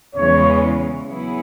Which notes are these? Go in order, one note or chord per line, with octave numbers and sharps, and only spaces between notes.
E2 C#3 E3 G#3 C#5
F#3 B3 E4 G#4